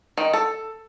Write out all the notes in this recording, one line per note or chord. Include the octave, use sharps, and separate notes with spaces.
D#3
A4